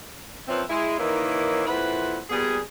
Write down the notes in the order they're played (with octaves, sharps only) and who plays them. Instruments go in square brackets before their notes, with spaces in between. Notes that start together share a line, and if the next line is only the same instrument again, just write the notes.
[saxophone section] A#2 F3 C4 C#4 B4 E5
G#3 E4 G#4
D#3 E3 A#3 C#4 D#4 E4
F2 A#2 E4 B4 C5 F#5
A#2 G3 B3 G#4